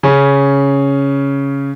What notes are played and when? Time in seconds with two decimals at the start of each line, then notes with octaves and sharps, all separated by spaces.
0.03 C#3 C#4